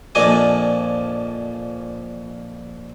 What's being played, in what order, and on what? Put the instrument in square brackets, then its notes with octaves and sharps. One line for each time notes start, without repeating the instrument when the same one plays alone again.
[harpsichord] F2 A#2 F3 D4 D#5 G#5